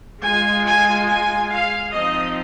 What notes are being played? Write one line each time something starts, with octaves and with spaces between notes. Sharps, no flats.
G#3 F4 G#5
G#5
G#5
F5
F3 C4 D#4 D#5